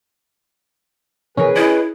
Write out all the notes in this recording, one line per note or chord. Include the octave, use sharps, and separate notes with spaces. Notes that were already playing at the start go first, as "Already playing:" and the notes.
B2 E3 C#4 G#4 A#4 B4
E4 D5 D#5